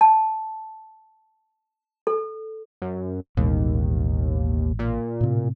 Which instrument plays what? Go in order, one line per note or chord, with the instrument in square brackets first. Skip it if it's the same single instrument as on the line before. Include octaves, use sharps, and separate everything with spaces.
[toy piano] A5
A4
[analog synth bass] F#2
[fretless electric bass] A1 B2 G#3 [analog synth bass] D#2
[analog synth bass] A#2
[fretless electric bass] A2 C3